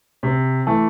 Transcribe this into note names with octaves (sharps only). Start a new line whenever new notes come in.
C3
E3 A3